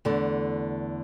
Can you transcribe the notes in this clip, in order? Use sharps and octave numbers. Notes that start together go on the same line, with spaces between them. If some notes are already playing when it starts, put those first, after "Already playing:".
E2 D3 A3